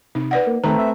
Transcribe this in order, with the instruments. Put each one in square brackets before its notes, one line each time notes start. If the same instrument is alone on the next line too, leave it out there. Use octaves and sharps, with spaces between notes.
[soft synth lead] C3 [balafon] D#4
[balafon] B4 D5 F#5
[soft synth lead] A#3
[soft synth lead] D#3 [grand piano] A3 C4 B4 [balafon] A#5
[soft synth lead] E5